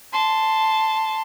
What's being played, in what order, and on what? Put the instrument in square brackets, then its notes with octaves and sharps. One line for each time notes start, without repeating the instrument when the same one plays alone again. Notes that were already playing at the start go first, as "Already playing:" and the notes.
[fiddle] A5 C6